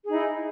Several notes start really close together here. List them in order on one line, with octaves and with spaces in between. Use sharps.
G#4 D#4 E4